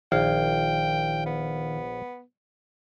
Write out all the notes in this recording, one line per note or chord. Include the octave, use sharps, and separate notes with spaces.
A#1 D#3 F5 G5
B3